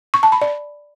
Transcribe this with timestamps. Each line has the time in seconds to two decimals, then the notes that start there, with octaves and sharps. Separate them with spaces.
0.14 C#6
0.23 A5
0.32 B5
0.41 D5